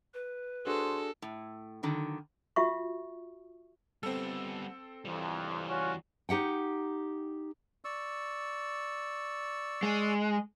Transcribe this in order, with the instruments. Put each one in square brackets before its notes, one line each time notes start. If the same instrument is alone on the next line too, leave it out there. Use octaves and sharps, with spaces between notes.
[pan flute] B4
[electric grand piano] D4 F#4 G#4 [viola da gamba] A4 [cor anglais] C5
[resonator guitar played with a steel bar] A2
D3 D#3 F#3
[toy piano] F4 F#4 E5 C#6
[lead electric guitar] G3 B3 [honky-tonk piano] C4 A4
[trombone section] F2 [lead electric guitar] E3 G3
[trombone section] C#4 F4 F#4
[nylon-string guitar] D#4 G4 F#5 G5
[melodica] D5 C#6 E6
[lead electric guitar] G#3